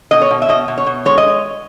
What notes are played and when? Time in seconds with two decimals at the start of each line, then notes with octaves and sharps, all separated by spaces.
0.11 B2 D#5
0.22 C#5
0.31 B2
0.42 E5
0.49 B2 D#5
0.68 B2
0.78 C#5
0.86 B2
1.05 G#3 C#5
1.18 D#5